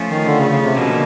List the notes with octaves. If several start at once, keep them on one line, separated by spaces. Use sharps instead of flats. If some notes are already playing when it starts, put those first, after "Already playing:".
Already playing: F3 A3 C#4 F4
D#3
D3
C#3
C#3
C3
B2 D3 F3 A#3 C#4